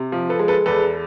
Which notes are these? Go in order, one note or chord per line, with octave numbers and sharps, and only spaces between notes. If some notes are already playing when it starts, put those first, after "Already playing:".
Already playing: C3
F3
A4 B4
G#3
A4 B4
E2 A4 B4